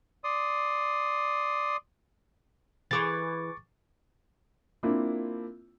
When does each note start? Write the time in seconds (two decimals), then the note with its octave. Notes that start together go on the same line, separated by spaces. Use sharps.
0.24 D5 C6 D#6
2.91 E3 G#4 C#6 D6 A6
4.83 A#3 C4 D4 E4 F4